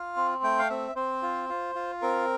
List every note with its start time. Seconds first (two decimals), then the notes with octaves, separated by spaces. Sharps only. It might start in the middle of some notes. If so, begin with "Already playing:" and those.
Already playing: F4 F5
0.16 C4
0.43 A3 G5
0.59 F5
0.70 C4 E5
0.96 C4 C5
1.23 F4
1.49 F4
1.75 F4
2.02 C4 A#4